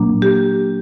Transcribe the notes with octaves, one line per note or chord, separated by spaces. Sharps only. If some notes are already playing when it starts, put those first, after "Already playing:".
Already playing: A#2 F#3 A#3 D4
G4